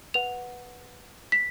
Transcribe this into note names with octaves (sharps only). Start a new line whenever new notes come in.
B4 F#5 F7
B6